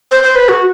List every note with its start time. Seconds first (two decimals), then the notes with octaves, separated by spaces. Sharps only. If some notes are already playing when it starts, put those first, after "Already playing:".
0.11 C5
0.23 C5
0.35 B4
0.49 F#4